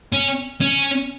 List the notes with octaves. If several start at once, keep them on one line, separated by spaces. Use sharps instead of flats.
C#4
C#4